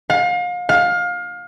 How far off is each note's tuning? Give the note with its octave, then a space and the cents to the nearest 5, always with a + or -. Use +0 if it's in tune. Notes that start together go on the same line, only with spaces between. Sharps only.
F5 +35
F5 +25